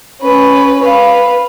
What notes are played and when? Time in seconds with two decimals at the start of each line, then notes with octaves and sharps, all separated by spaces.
0.21 C#4 B4
0.80 B4 F5